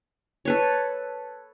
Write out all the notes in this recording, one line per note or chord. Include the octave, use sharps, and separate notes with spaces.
A4 B4 C#5